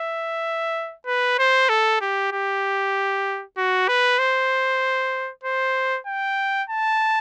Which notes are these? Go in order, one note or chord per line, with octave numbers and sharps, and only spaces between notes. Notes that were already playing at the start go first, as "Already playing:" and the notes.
Already playing: E5
B4
C5
A4
G4
G4
F#4
B4
C5
C5
G5
A5